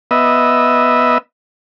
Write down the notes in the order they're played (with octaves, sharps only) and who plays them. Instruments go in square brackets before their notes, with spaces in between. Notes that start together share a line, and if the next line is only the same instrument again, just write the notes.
[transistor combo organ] B3 D#5 E5